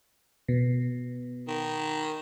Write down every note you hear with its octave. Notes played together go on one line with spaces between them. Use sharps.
B2
D#3